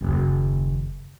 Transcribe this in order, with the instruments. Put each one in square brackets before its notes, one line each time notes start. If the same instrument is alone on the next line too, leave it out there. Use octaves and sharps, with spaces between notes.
[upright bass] F#1 D#2